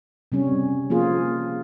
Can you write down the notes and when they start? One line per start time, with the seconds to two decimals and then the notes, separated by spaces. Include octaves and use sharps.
0.32 C3 G3 C#4
0.90 F3 A#3 F4 G#4